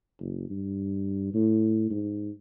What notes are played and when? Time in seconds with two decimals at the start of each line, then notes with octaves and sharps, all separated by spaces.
0.20 F#1
0.50 G2
1.34 A2
1.90 G#2